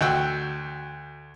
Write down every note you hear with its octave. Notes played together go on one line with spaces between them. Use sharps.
D2 F#4 G5 E6